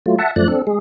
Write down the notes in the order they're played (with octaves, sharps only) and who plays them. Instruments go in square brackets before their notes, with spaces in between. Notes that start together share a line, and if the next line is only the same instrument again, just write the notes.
[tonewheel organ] F#3 A3 F4
E5 F#5 A5
F#2 F3 A3 D5 F#6
C4 D4 A4
G#3 G#4